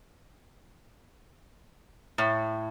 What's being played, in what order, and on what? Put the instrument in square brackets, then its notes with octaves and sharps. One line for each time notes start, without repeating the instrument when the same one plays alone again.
[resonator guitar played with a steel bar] A2